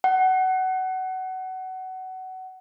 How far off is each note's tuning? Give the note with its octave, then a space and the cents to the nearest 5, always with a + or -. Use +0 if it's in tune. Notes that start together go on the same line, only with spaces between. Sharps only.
F#5 +20